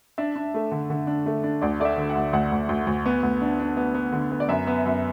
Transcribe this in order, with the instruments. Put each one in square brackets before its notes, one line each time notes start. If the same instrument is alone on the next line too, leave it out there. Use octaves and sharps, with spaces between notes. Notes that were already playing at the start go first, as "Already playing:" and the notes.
[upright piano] D4 E5
D4
A3
D3
D3
D4
A3
D4
D2 D5
A3 D5
E5
D3
F#5
D2
D2 F#5
D2
D2
D2
B3
D2
D4
D4
B3
B3
D3
B3
D5
F#2 E5
B3
F#2